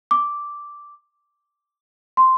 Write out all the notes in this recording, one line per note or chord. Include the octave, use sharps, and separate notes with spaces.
D6
C6